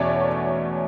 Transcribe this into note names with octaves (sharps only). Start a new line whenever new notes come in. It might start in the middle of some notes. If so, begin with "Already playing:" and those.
Already playing: E2 B2 A3 C#4 C#5 D5